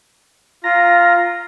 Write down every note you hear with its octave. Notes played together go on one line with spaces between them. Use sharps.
F4 A#5